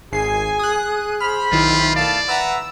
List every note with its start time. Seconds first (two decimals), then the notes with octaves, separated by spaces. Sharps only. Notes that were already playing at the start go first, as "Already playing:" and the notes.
0.12 G#1 G#4 G#5 C7
0.59 D#6 F#6
1.20 C5 B5 F6
1.52 B1 D#3 E4 F4
1.96 A3 D5 F5 A5
2.29 B4 E5 F#5 A#5 E6